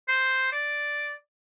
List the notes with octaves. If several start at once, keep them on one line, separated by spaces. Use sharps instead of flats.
C5
D5